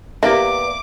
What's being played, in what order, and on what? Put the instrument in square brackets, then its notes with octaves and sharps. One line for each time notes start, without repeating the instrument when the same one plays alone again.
[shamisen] A#3 [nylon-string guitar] B3 G4 D5 [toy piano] E4 E5 [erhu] D6